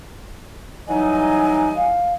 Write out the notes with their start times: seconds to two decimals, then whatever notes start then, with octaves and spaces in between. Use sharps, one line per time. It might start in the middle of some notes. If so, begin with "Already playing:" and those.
0.88 E3 F#3 G3 D#4 D#5 G#5
1.76 F5